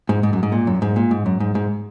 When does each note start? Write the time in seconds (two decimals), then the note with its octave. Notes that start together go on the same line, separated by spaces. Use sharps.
0.09 G#2
0.23 G#2
0.33 F#2
0.43 G#2
0.52 A#2
0.67 F#2
0.82 G#2
0.96 A#2
1.11 G#2
1.26 F#2
1.40 G#2
1.55 G#2